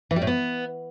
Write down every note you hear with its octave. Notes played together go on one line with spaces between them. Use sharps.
E3
G3
A2
B3